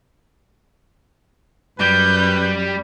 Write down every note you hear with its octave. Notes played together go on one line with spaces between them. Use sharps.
F#2 G3 B4 G6